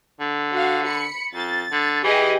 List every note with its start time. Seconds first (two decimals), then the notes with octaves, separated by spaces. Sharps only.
0.20 D3
0.53 F#4 F5
0.86 B5 C#7
1.35 F2 A6
1.72 D3
2.04 E3 G4 G#4 D#5